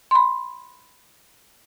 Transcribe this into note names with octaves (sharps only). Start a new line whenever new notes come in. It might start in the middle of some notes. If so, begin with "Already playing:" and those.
B5 C6